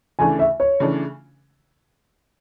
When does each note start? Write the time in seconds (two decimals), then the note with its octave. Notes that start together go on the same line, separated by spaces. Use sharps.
0.19 C#3 E3 A3 D4 G#5
0.39 E5
0.60 C#5
0.80 C#3 E3 A3 D4